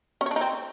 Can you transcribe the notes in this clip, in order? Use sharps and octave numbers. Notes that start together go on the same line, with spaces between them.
C#4
C#5
D4
D#4
C4